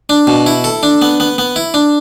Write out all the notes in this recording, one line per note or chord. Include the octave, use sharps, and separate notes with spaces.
D4
B2
E4
A4
D4
B3
B3
B3
E4
D4